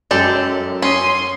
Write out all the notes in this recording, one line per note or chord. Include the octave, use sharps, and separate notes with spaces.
F#2 G#3 G4 A4
C#4 C6 D#6